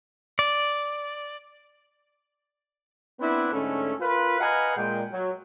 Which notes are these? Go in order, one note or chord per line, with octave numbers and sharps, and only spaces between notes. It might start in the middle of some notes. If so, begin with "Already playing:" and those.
D5
B3 C4 D4 E4 B4
G#2 D3 A3 C#4
F4 A#4 B4
B4 D#5 F5 F#5 G#5 A#5
A#2 G#3 G5
F#3